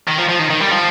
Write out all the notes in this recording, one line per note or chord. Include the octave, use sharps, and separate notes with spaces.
D#3
F3
F3
D#3
D#3
G3
F3